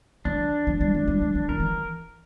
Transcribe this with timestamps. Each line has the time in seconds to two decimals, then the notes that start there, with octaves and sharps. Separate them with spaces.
0.25 E3 D4
0.67 F3
0.81 G3
0.95 A3
1.08 G3
1.21 G3
1.35 E3
1.49 D3 A#4
1.60 E3